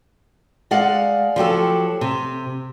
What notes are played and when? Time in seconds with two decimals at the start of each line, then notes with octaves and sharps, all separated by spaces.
0.71 G#3 D5 F5 F#5
1.36 F3 F#3 G4 A4
2.01 C3